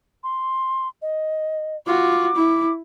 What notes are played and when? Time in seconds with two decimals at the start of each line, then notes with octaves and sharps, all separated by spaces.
0.23 C6
1.02 D#5
1.87 F4 F#4 D6
2.35 E4